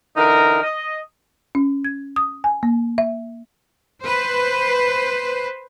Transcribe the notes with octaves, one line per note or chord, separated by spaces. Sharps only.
D3 E3 D#4 A#4
D#5
C#4
G#6
D#6
G#5
A#3
E5
B4 C5